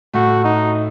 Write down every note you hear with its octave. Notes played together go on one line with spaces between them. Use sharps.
A2 A3 F#4
D#4